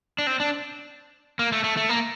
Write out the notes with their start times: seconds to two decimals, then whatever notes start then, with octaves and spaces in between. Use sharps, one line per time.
0.18 D4
0.27 C4
0.40 D4
1.39 A#3
1.52 A3
1.64 A3
1.77 A3
1.89 A#3